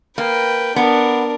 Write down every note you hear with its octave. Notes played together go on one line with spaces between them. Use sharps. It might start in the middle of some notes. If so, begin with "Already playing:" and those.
A#3 B4 G5
B3 D4 A#4